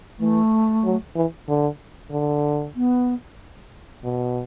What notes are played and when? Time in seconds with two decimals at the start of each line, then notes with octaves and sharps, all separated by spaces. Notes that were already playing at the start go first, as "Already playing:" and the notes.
0.19 E3 A3
0.84 F#3
1.15 E3
1.48 D3
2.11 D3
2.76 B3
4.04 B2